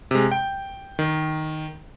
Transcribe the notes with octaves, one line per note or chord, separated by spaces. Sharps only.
C3 G#3
G5
D#3